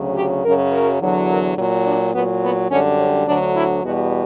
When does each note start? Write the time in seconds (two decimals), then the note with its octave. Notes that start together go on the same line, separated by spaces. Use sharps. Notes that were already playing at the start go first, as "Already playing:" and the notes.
Already playing: D2 C#3 F#3
0.16 G4
0.44 F#2 C#3 F#3 A#4
0.72 A#4
1.00 E2 D3 F#3
1.29 A#4
1.57 A#2 F#3
1.86 D4
2.14 A#2 F#3 B3
2.42 B3
2.70 F#2 D3 G3 C#4
2.98 C#4
3.27 D2 D3 F#3 D4
3.55 E4
3.84 E2 B2 G3 F#4